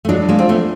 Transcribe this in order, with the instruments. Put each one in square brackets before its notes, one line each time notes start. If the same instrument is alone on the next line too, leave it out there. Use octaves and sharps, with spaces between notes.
[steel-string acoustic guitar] A3
[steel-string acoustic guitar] F#3 G#3 [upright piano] D4
[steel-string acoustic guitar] G#3 A#3
[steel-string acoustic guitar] C4 [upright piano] F4
[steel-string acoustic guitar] A3 B3